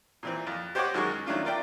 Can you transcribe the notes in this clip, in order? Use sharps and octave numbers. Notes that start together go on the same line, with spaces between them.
A#2 E3 C4
F2
G4 C5 C#5 D#5 F#5 D6
F#2 D#3 G#3 F#4 A#4 C#6
D#3 F#3 A3 D4 F4
F4 A#4 D5 E5 G5